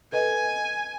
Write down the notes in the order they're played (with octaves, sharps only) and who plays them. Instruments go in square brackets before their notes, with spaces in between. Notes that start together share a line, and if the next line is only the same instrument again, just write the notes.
[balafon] A4 B4 D#5 [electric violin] G#5